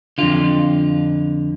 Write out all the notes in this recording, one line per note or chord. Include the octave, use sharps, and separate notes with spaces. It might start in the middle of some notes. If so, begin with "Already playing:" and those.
F2 D3 F4